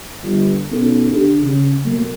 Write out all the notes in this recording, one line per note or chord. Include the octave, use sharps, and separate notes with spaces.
G1
B2 B3 C#4 D#4 A4
D3 G4
C#3
B2 F#3 A3 A#3